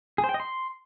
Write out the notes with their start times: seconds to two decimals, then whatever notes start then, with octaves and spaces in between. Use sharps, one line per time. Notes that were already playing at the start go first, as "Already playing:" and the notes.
0.18 G#4
0.24 C5
0.29 G5
0.34 D#5
0.40 C6